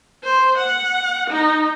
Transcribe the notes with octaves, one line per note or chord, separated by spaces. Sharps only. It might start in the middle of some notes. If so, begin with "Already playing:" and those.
C5
F#5
D#4